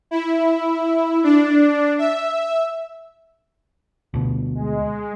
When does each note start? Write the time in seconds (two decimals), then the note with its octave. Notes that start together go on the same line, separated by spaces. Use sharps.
0.11 E4
1.24 D4
1.98 E5
4.14 D2 B2
4.55 G#3